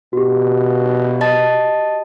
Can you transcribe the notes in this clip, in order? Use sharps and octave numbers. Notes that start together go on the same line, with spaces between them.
B2 F#4 G4
D#5 A5 A6